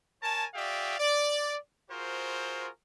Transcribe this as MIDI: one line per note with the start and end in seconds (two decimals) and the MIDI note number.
0.22 0.45 70
0.22 0.45 73
0.22 0.45 80
0.22 0.45 81
0.54 0.96 66
0.54 0.96 68
0.54 0.96 74
0.54 0.96 76
0.54 0.96 77
0.54 0.96 79
0.99 1.57 74
1.90 2.69 65
1.90 2.69 66
1.90 2.69 68
1.90 2.69 70
1.90 2.69 72